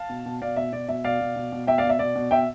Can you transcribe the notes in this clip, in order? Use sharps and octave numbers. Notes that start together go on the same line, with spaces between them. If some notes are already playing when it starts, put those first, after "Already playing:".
Already playing: F5 A5
B2
B2
B2 D5 F5
B2 E5
B2 D5
B2 E5
B2 D5 F5
B2
B2
B2
B2 E5 G5
D5 F5
B2
E5
B2 D5
B2
B2 E5 G5